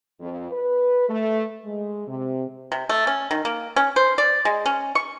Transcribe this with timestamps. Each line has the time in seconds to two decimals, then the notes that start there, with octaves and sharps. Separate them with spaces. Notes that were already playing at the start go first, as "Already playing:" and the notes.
0.20 F2
0.52 B4
1.09 A3
1.64 G#3
2.08 C3
2.72 C3
2.89 A3
3.07 C#4
3.31 D#3
3.45 A#3
3.76 C#4
3.96 C5
4.18 D5
4.45 G#3
4.66 C#4
4.95 C#6